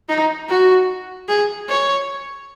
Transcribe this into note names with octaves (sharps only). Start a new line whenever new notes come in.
D#4
F#4
G#4
C#5